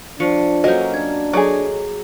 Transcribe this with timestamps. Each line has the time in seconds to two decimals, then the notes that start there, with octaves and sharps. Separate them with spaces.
0.20 F3 D4 C5 C#6 C#7
0.64 F#3 A#3 C#4 A4 C5 D#5 G6
0.94 D4 G#6
1.33 F#3 G#4 A4 C#5 D#5 D6